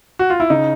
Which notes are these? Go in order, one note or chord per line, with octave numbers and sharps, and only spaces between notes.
F#4
F4
E4
C#3 D#4